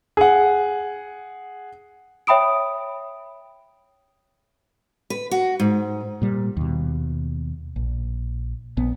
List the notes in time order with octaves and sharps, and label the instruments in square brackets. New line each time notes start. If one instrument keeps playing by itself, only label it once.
[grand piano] G#4 F#5
[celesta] C#5 E5 G5 B5 D#6 D7
[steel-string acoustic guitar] B4
F#4
G#2
[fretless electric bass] A#2 G3
D#2 B2
A#1
A#1 B3